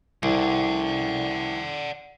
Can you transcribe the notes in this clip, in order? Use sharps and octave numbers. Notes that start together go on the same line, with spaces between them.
C2 D5 F#5